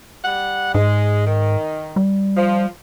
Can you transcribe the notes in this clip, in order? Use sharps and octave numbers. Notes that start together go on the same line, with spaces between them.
G3 F#5
G#2 G#3
D#3
G3
F3